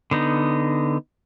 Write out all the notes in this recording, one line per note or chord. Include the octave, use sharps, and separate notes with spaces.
D3 B3 D#4